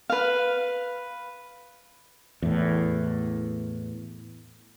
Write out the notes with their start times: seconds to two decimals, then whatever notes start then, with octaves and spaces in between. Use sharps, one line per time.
0.10 B4 F5
2.42 E2 A2